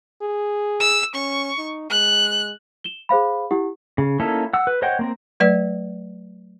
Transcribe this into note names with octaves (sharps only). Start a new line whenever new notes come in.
G#4
E6
C#4 C#6
D#4
G#3 F#6
E7 G7
G#4 C5 F5 B5
E4 G4 F#5
C#3
A#3 C#4 D#4 E4 A4
F#5 E6
B4
C5 C#5 D#5 F#5 G5
A#3 C4 A#4
F#3 A3 B4 D5